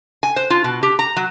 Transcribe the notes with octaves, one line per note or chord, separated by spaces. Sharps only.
G#5
C5
F4
B2
G4
A#5
F#3